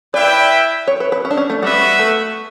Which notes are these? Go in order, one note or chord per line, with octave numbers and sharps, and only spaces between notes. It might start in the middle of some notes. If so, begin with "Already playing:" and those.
E4 B4 D5 E5 G5
C#5
B4
B4
C#4
D4
C#4
A3
G3 B3 F#4 B4 E5
A3